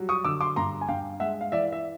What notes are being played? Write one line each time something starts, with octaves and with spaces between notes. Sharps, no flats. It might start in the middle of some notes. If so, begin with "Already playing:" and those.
Already playing: F#3 G3
C#6 D#6
D3 D6 E6
C6 D6
G2 A#5 C6
G#5
G2 F5 G5
G#3 E5 F#5
F5
E3 D5 E5
E5